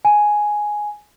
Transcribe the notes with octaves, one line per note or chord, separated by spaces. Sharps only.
G#5